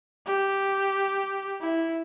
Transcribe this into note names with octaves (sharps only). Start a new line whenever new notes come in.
G4
E4